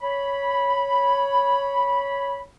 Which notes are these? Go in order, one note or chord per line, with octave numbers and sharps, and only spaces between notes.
C#5 B5